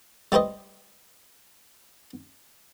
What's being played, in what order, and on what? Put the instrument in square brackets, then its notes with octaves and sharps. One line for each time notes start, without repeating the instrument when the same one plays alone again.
[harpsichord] G3 G4 B4 C5 D#5